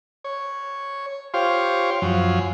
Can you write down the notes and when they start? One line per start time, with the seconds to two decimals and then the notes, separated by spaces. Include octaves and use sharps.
0.24 C#5
1.34 F4 G4 C5 C#5 F5 C6
2.02 F#2 F3 F#3 F4 C6